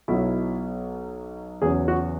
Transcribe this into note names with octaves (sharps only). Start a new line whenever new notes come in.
B1 B2 F#3 E4
E2 C#3 F#3 G#4
F#4